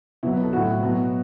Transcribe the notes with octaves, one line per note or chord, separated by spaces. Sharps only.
B2 F#3 E4
B4
A4
A2 F#3 F#4
B2 F#3